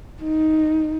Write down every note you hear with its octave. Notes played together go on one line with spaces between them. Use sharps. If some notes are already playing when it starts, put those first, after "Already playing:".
D#4